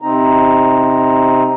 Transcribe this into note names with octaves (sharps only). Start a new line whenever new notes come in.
C3 C4 D#4 A#5